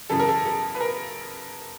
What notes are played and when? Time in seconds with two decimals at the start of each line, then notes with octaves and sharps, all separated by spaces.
0.10 F#2 C#3 E3 A4
0.19 A#4
0.28 A4
0.45 A4
0.75 B4
0.81 A#4